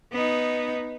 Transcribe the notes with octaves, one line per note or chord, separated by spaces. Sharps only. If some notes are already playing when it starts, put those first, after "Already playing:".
B3 D#4